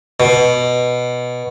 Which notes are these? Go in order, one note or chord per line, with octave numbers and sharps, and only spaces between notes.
B2